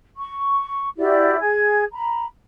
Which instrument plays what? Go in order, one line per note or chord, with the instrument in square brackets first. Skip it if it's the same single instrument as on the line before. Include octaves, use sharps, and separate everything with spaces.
[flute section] C#6
E4 F#4 G4 D5
G#4 G#5 G#6
A#5 B5